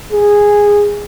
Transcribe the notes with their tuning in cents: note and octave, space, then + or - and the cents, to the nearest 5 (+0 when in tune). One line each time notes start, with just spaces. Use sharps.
G#4 -10